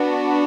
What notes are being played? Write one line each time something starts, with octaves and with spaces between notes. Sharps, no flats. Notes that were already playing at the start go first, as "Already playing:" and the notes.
Already playing: B3 D4 F#4